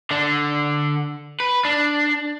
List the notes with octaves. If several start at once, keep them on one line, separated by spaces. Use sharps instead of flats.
D3 D4
B4
D4